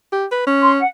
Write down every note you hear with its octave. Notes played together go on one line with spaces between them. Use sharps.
G4
B4
C#4
C6
F#5